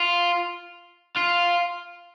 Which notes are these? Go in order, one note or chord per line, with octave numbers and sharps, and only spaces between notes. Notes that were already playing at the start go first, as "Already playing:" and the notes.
Already playing: F4
F4